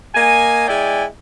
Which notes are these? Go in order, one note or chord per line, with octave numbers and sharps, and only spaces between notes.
A#3 D#5 G#5
G#3 E4 D5 G5 G#5